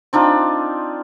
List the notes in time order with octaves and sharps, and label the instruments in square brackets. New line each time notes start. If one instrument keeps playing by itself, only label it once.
[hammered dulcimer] C4 D4 D#4 F4